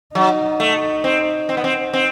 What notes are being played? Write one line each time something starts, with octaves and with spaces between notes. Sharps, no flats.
F#3 D#4
A3
C4
C4
B3
C4
C4